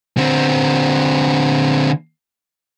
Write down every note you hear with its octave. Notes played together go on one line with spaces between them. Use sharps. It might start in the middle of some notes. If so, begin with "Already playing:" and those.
D3 C4